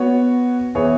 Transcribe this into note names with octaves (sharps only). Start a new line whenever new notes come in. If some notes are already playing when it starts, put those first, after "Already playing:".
Already playing: B3 F#4 C#5
E3 B3 G#4 C#5